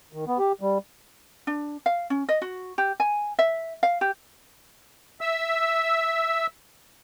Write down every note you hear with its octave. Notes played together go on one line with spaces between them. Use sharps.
D#3
B3
G4
G3
D4
F5
C#4
D#5
F#4
G4
G#5
E5
F5
G4
E5 E6